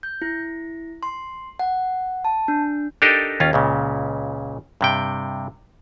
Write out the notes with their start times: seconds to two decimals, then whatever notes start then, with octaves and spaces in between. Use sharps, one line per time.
0.03 G6
0.22 E4
1.03 C6
1.59 F#5
2.25 A5
2.48 D4
3.02 D4 D#4 G4 A4 A#4 D#5
3.40 D#2 C#4 F4
3.53 C#2 A#2 C#3
4.81 G2 C3 G5